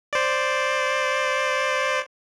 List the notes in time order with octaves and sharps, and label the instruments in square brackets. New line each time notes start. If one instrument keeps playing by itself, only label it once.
[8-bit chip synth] C5 D5